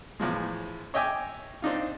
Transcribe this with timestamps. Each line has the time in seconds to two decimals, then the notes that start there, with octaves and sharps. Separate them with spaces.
0.20 E2 A2 F3 G#3
0.94 C#5 D#5 E5 G5 G#5 D6
1.62 C4 D4 D#4 F4